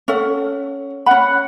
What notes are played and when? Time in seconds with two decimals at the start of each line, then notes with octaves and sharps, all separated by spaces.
0.08 C#4 A4 F#5
1.06 C#4 F#5 B5